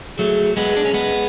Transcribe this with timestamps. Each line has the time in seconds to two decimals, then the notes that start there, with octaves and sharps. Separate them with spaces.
0.19 F#3 A3 G#4
0.56 G#3 B3 G#4
0.76 D4
0.85 C#4
0.94 G#3 B3